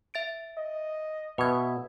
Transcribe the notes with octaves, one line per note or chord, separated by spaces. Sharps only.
E5 A6 D7
D#5
B2 B4 E5 G#6